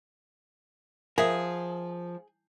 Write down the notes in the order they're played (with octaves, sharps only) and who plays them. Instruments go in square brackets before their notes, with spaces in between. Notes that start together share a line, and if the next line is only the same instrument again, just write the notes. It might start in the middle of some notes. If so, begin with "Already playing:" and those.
[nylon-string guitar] F3 [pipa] G#4 [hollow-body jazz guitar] A#4 E5 F#5